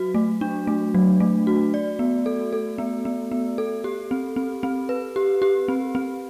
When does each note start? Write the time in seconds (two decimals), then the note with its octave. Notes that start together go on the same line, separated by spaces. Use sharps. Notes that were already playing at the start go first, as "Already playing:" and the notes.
Already playing: F#3 F#4
0.14 A3
0.41 D4
0.67 A3
0.94 F#3
1.20 A3
1.47 F#4
1.74 D5
1.99 B3
2.26 A4
2.53 A4
2.78 B3
3.05 B3
3.32 B3
3.58 A4
3.84 G4
4.11 C4
4.36 C4
4.63 C4
4.89 B4
5.16 G4
5.42 G4
5.68 C4
5.95 C4